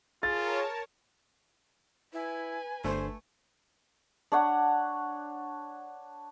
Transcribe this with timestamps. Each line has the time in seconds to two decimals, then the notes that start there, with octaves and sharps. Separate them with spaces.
0.23 F4 G#4 A#4 C#5 A5 A6
2.13 E4 B4 G#5
2.84 G1 A3 D4 A4 C5
4.32 D4 C#5 F#5